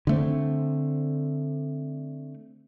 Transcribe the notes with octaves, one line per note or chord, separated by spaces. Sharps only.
D3 A3 C4